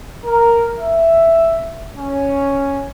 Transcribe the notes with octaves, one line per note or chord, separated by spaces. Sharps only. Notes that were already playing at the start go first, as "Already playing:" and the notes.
A#4
E5
C#4